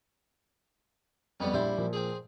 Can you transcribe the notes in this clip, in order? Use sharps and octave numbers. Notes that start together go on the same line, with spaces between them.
F2 G3 B3 C#4
A#1 G3 E4 C5
A#2 F3
C4 G#4